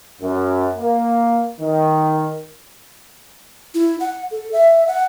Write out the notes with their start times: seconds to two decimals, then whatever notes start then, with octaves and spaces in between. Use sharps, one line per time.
0.22 F#2
0.79 A#3
1.61 D#3
3.75 E4
4.00 F#5
4.31 A4
4.53 E5
4.87 F#5